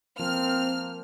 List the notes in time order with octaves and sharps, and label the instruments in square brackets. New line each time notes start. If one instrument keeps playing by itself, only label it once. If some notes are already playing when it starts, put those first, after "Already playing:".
[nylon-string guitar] F3 [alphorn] A#3 [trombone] C4 [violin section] F6